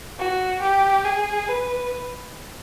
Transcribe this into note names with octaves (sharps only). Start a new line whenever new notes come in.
F#4
G4
G#4
B4